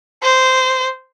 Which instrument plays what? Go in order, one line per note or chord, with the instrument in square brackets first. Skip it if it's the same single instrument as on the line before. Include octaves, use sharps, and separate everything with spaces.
[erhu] C5